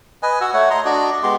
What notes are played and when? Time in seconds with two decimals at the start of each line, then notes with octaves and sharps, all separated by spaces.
0.23 B4 D#5 G#5
0.41 F#4 F#5 E6
0.54 A3 C#5 F#5
0.70 D#5 A#5 C6
0.85 D4 F#4 D5 D#5
1.23 G#3 B3 G4 C6